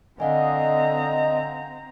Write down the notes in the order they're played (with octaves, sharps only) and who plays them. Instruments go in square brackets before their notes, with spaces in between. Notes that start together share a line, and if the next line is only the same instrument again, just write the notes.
[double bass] D3 [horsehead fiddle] C4 A#5 [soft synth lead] D#5 [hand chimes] F5 F#5 G#5